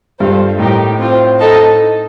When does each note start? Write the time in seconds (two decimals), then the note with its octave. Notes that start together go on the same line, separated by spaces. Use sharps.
0.19 G2 F4 A4 C5
0.59 A2 D#4 G4 A#4
0.98 C4 F4 C5
1.39 D#4 A4 D#5 A5